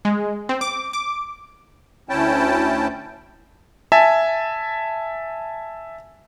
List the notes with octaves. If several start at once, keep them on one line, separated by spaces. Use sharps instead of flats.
G#3
C4
D6
D6
D2 C#4 E4 G5 A5
E5 G#5 A5